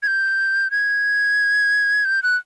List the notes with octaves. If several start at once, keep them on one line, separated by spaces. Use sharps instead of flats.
G#6
G6
G#6
G6
F#6